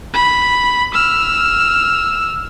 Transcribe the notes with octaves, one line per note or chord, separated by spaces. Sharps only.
B5
E6 F6